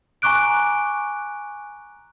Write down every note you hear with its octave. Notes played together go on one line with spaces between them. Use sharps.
G#5 A#5 C#6 D6 F#6 D7